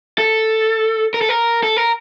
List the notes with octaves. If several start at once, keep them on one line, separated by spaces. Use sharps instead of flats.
A4
A#4
A4
A#4
A4
A#4